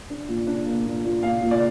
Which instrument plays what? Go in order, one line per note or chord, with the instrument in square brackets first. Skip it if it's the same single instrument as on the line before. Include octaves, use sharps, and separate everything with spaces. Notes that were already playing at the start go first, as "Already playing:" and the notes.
[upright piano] D4
A#2
D4
A#3
A#2
A#2
A#2 F5
A#2
D5